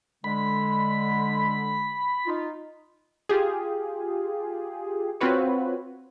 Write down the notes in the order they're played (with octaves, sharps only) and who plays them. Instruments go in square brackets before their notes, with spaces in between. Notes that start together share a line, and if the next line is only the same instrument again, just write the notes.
[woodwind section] D3 G#3 [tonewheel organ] B5
[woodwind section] D#4 F4
[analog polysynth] F4 G4 G#4
C4 F4 F#4 B4 C#5